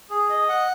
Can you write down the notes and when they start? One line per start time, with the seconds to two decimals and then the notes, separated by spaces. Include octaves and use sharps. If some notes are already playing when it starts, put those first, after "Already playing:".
0.10 G#4
0.30 D#5
0.49 F#5